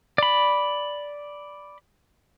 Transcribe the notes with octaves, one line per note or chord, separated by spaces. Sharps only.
D5 B5